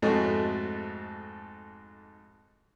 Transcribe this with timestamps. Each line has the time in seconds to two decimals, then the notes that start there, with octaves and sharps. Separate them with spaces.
0.02 F2 G#2 A3 F#4 D#5